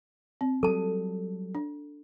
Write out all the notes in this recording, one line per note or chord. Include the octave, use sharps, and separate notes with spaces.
C4
F#3 G3 A4 A5
D4